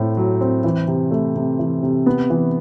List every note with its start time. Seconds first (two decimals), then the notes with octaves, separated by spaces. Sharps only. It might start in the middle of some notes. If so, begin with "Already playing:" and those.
Already playing: A2 A3 C4
0.17 F#3
0.41 C4
0.64 E3
0.88 C3
1.11 A3
1.36 C3
1.59 E3
1.83 C3
2.06 B3
2.30 E3